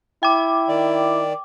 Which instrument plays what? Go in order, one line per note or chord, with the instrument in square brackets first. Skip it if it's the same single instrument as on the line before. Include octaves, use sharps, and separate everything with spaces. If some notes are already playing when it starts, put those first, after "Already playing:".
[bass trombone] E4 [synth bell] G5 D6
[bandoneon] D#3 D5